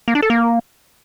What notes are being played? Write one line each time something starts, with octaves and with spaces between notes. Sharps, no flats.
A#3
D4
A4
A#3